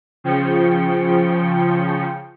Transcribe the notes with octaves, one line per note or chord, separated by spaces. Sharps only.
C#3 F3 G5 C#7